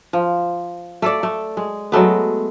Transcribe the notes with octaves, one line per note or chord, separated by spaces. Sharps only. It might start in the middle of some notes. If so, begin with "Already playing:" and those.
F3
A3 A4 D5
A3
G#3
F#3 G#3 A3 B3